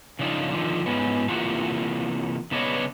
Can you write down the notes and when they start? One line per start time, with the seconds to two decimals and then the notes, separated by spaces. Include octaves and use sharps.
0.19 C#3 F3 D4 D#4 F4
0.51 D3 D#3 F3
0.86 G#2 B3 C#4
1.28 C3 E3 A#3 F4 F#4 A4
2.51 C#3 B3 D4 B4 C#5 D#5